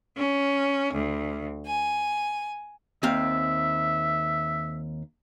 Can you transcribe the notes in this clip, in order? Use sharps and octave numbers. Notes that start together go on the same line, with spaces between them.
C#4
D2
G#5
D#2 C4 E5 F5